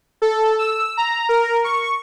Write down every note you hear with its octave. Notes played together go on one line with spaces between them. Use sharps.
A4
E6
A#5
A#4
C#6